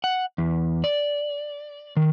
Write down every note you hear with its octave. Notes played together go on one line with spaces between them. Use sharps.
F#5
E2
D5
D#3